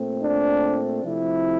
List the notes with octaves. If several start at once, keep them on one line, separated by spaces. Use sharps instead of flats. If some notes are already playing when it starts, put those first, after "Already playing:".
Already playing: A#2 A3 C4
D4
C3 F3 A3 C4 E4